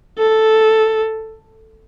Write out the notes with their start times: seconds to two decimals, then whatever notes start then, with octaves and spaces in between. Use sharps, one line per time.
0.18 A4